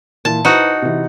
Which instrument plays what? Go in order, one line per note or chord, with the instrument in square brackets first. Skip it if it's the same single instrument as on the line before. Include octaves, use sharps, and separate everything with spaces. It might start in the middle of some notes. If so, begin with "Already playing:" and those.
[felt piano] A#2 E3 [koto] A5
[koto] D#4 F#4 [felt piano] E4 B4 C5
[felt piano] C3 E3